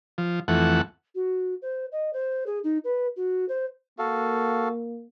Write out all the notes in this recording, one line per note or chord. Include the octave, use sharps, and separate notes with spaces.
F3
F2 E3 A3 F#5
F#4
C5
D#5
C5
G#4
D#4
B4
F#4
C5
A#3 F#4 A4 F5